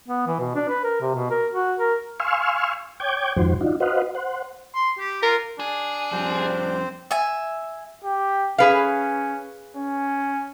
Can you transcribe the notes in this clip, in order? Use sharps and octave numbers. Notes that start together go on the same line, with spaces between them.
B3
E3
B2
D4
B4
A#4
C3
B2
A#4
F#4
A#4
F5 G#5 C6 C#6 E6 F6
C#5 G5 D6 G6 G#6
F2 G#2 D#3 F3 F#4 C5
D4 D#4 F4 F#4
F#4 B4 C5 D#5 F5 F#5
C5 F#5
C6
G4
F4 A#4
D4 G#4
F2 G3 C4 C5
E5 G#5
G4
C#4 G#4 B4 F5
C#4